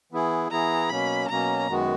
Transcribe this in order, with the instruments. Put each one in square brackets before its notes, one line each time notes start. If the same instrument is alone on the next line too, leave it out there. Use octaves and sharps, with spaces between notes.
[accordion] E3 B3 E4 G#4
[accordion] E3 B3 E4 G#4 [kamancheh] A#5
[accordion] B2 F#3 A#3 C#4 [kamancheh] B5
[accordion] B2 F#3 A#3 C#4 [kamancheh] A#5
[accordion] F#2 D#3 G#3 B3 F#4